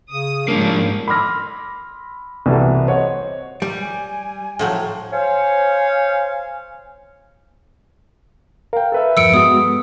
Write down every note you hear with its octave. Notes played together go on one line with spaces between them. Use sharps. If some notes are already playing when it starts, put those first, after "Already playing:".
C#3 D#6
G#2 F3 G3 A#3 C#4 D4
B5 C6 D6 E6 F6 A#6
C2 E3 G3 F#4 A4
C5 C#5 D#5 F#5
G3
G#5
A2 F3 F#3
C5 C#5 F5 G#5
A#4 F5 G5
A4 B4 E5
E2 G2 F3 E6 C#7 D7
G#3 B3 F#4 D#6